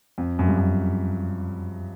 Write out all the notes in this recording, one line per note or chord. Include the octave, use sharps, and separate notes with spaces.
F2
F#2
G2
F#2